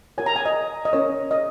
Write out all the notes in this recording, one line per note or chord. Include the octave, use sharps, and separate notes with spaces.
F#4 A#4 C#5 G#5
A#5
G#5
D#5
D#5
C#4 A#4 C#5
D#5